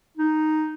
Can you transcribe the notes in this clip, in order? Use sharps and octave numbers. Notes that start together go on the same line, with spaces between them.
D#4